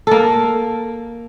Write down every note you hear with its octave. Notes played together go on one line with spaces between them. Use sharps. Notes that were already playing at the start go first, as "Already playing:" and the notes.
A#3 A4